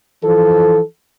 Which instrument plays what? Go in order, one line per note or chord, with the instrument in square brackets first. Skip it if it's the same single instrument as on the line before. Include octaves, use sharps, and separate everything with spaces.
[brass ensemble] E3 F3 A4